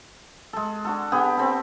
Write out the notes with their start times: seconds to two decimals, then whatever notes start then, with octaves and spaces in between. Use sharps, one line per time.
0.53 G#3 A4
0.85 D4 F#4 A4
1.12 D3 B3 G4 G#4
1.37 C4 A4